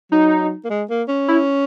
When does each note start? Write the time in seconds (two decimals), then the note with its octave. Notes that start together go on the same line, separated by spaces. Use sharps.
0.12 F#3 D#4
0.65 A#3
0.70 G#3
0.90 A#3
1.09 C#4
1.28 E4